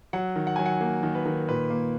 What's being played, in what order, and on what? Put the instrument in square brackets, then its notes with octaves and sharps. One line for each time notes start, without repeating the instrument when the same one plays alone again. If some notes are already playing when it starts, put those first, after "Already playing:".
[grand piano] F#3 F#5
D#3
F#5
F#3 G#5
F#5
A#3
D#3
B4
D#3
A#2 B4
A#3